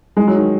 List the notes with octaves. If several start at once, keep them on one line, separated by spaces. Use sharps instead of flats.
G#3
F#3
D#3